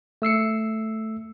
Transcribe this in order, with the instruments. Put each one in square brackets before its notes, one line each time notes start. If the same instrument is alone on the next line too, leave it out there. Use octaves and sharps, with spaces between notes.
[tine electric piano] A3 E6 C7 C#7